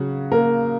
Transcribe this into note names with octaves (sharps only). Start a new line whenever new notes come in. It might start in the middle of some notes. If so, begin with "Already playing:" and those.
Already playing: C#3 F#3 F#4
A#3 A#4